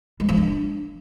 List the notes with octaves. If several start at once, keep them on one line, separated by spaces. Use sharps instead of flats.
G#3
F3
D4